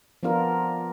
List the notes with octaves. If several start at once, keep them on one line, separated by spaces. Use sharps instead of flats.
F3 B3 D4 F4 A#4